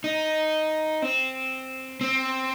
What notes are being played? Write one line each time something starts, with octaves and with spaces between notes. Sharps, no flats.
D#4
C4
C4